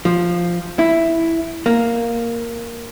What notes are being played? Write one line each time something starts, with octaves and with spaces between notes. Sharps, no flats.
F3
E4
A#3